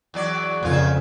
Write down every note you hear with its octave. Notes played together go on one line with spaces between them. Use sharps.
E2 F#3 D5
F2 A#2 C#3 F4